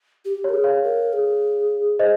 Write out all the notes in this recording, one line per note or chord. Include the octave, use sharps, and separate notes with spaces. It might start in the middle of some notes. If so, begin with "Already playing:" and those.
G4
A#4 C#5
G#4
C#5 F5
A#4
G#4
C5 D#5